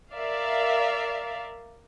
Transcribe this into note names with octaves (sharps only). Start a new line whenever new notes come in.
A#4 D5 E5 F5